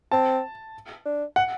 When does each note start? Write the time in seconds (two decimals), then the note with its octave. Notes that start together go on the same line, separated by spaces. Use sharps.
0.11 C4 A5
1.06 D4
1.36 F#5